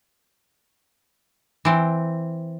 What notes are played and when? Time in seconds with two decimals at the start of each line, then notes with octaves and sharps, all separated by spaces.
1.65 E3 C4